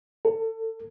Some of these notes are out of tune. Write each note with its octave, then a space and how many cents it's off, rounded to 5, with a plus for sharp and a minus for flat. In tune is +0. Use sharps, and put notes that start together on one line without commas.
A4 +30